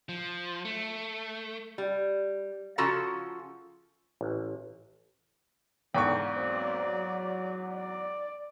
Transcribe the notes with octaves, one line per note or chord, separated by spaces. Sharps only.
F3
A3
G3
C#3 F3 F4 F#4 A4 A#5
A1
E2 G#2 D3 G5 C#6
F#3 A#3 C4 D5
F#3
D5